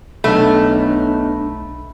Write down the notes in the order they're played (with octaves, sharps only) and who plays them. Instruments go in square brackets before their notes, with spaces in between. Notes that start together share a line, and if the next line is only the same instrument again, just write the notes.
[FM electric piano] B1 B5 [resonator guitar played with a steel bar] A3 [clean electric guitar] B3 D#4 A4 [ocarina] D4